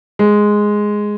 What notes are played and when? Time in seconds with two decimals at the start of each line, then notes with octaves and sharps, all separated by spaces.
0.19 G#3